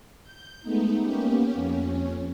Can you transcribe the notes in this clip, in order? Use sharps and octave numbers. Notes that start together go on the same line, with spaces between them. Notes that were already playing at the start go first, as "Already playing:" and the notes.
G6
G#3 A3 B3 D#4
A#3 B3 C#4 G4
F2 C#4